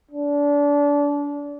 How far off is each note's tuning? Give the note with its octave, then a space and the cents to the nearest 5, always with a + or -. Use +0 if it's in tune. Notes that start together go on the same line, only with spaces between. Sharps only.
D4 -25